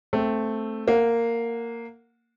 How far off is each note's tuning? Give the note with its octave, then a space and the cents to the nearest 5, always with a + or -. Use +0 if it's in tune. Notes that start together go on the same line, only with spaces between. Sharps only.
A3 +0 C4 +0
A#3 -10 F#5 -25